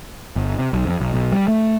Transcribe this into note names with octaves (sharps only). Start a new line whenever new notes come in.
G1
C3
B1
F2
B1
B1
G3
A3